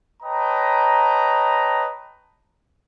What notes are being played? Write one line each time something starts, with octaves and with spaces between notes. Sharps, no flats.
B4 C#5 D#5 G5 A5 A#5